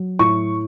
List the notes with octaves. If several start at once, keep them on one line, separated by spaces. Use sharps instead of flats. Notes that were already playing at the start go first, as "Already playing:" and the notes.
Already playing: F#3
A2 C#6